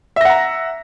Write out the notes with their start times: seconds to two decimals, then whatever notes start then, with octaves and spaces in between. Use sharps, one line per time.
0.16 E5
0.21 A#6
0.25 F#5
0.30 A#5